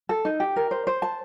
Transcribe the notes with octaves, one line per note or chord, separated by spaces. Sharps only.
A4
D#4
G4
A#4
C5
C5
A5